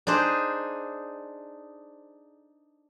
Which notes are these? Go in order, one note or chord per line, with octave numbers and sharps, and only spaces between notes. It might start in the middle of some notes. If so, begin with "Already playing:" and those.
D4 D#4 G#4 C5